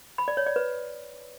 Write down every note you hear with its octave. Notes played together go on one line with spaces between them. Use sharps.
B5
D5
C#5
D5
B4